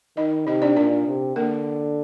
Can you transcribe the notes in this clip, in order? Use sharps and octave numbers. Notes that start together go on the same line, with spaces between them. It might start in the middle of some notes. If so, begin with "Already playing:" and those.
D#3 D#4 D#5
C3 D#4 D#5
D4 D5
A#2 D4 D5
C3
D3 A#3 A#4